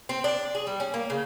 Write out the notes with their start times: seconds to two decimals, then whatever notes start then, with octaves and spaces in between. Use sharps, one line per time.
0.09 C4
0.24 D4
0.55 G#4
0.67 G3
0.80 C#4
0.94 A#3
1.10 C#3